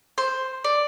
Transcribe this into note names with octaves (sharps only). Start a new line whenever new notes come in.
C5
D5